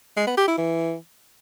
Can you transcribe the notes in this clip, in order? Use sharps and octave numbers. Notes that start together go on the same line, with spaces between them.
G#3
B3
G4
E4
E3